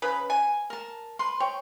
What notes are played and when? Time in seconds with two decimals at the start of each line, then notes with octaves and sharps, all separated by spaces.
0.02 C#3 B4
0.30 G#5
0.70 A#4 A5
1.19 B4 C6
1.40 C#5 G5